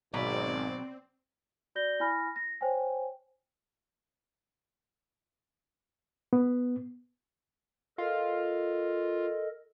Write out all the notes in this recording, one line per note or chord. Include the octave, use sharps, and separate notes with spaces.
G#1 B2 F#3 C4 D5
F#4 D5 G6 A#6 G7
E4 G#5 B5 F6 A#6
A#6
C5 C#5 G5 G#5
B3
F4 A4 A#4 D#5